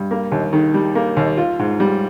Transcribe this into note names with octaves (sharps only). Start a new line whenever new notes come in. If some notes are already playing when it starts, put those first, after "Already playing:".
Already playing: G2
A#3
D#2
D#3
G3
A#3
D#2
F4
G#2
G3